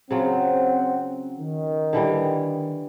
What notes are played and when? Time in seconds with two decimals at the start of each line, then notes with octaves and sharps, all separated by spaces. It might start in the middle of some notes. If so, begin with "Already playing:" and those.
0.11 C#3 F#3 C4 F4 F#5
1.41 D#3
1.93 D3 E3 G3